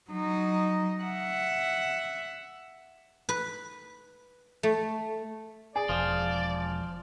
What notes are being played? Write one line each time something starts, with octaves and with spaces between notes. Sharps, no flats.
F#3 D#4
E5 F#5
B4
A3
G#4 D5
E1 F3